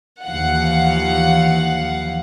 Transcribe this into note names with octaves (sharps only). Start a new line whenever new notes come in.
D#2 E3 F3 F5 F#5